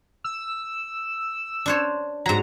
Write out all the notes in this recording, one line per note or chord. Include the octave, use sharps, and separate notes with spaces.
E6
D4 C5 C#5
G#2 F#3 A#5